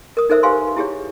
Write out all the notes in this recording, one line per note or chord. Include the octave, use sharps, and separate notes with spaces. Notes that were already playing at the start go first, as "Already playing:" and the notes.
A#4 D#6
D#4 A4 A#4 C5 E5 E6
G4 B4 C5 F5 G#5 C6
E4 G4 G#4 C#5